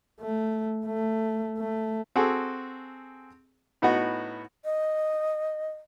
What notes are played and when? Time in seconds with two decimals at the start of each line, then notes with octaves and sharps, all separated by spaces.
0.21 A3
0.86 A3
1.58 A3
2.16 C4 F#4 G#4 A4
3.82 A2 B3 D#4 F#4
4.65 D#5